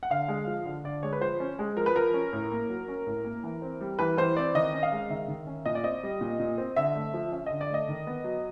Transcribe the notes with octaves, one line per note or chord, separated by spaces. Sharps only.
F#5
D3 F5
G#3
F3
D3
D3 D5
G#3 C#5
B4
F3 C5
C#4
G#3
F3 A#4
B4
F3 A#4
C#4
A2
A#3
F#3
C#4
A2
A#3
E3
C4
G3
E3 B4
E3 C5
C4 D5
D#3 D#5
C#4
F5
G#3
D#3 E5
D#3
C#4
A#2 D#5
D5
C4 D#5
G3
A#2
A#2
C4
D3 E5
A3
F3
C#4 E5
D3 D#5
D5
A3 D#5
D#3
B3
F#3